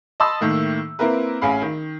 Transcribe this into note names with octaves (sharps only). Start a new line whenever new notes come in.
D#5 A5 B5 C6 D#6 E6
A2 D#3 A3 A#3
A#3 C4 E4 A#4 B4
A1 C#4 G#4 F5 B5
D#3